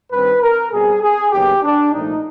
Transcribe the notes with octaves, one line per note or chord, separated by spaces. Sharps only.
G2 D#3 G3 C4 B4
A#4
B2 G3 C4 G#4
G#4
D#2 C#3 F#3 B3 G4
D4
C2 A#2 F3 A3 D#4